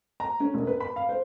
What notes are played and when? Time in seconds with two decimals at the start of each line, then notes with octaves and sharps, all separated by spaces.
0.20 A#5
0.40 C#4
0.54 E1
0.67 B4
0.80 B5
0.96 F5
1.09 C5